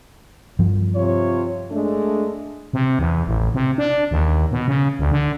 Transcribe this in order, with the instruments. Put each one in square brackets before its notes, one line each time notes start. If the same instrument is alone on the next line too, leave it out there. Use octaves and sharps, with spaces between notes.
[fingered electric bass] G2 F3
[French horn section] C3 F4 C#5
G#3 A3 D4
[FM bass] C3
E2
A1
C3
D4
D#2
B2
C#3
D2
D3